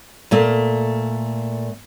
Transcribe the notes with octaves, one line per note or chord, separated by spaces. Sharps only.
A#2 A3 A#3